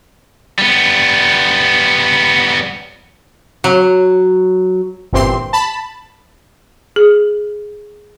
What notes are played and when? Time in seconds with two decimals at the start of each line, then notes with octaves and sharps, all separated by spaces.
0.58 G3 B3
3.64 F#3
5.13 G1 A#2 E3 C4 G4 C6
5.53 A5 B5
6.96 G#4